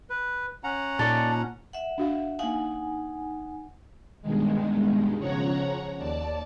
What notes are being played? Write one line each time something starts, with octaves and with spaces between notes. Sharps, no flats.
B4
C#4 F#5 A#5
A#2 D#4 A4 D5
E5 F#5
D4 F#4 F5
A#3 D#4 F5 F#5 G#5
G2 B2 D#3 G#3
C#3 F3 C#5 F#5 A#5
D#2 D5 A5